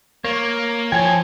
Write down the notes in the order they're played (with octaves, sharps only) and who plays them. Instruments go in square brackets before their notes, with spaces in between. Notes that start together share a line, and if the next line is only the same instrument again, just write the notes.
[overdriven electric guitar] A#3 [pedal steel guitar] C#5
[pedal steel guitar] F3 G#5 [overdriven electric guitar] C#5 G5